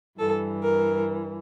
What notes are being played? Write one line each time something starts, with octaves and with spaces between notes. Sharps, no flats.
G2 E3 A4
A#4